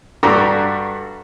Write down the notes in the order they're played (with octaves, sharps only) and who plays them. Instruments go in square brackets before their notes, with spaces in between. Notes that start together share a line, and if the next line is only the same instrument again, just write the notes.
[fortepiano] G2 D4 F#4 G4 A4 A#5